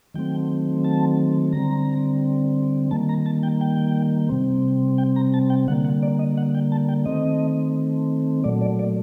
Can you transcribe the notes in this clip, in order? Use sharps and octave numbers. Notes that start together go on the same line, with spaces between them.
D#3 F#3 A3 C4 G5
A5
D3 G3 C4 A#5
D#3 G3 A#3 A5
A#5
A5
G5
G5
C3 G3 C4
G5
A#5
A5
G5
D3 G3 A#3 F#5
F#5
D5
D#5
F#5
G5
A5
G5
D#3 A3 C4 D#5
A#2 F#3 A3 D5
D5
D5